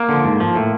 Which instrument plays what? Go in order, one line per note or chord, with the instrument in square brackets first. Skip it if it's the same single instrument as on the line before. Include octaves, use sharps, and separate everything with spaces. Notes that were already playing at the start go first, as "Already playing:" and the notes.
Already playing: [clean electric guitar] A#3
D3 F3
G#2
F3
A2